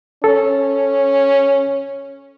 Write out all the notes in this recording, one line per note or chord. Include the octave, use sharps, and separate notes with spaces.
C#4 A4